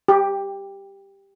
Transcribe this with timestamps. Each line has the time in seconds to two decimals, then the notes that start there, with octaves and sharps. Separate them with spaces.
0.08 G4